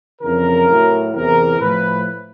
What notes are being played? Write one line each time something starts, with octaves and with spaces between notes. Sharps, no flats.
F2 C#3 E3 A#4
A2 F#3
E2 C3 E3 A#4
A2 F3 B4